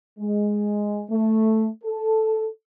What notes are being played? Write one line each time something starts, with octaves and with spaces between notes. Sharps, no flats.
G#3
A3
A4